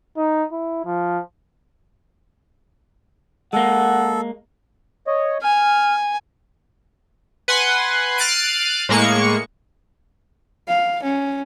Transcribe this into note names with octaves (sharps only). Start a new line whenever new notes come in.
D#4
E4
F3
G#3 A#3 A4 F#5
C#5 D#5
G#5 F6
B4 F#5 G#5 C6
F6 F#6 A6 C7 D7 D#7
A2 G#3 A#3 C#6 C#7
F5
C#4